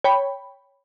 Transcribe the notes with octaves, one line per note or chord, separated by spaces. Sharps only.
C#5 G5 B5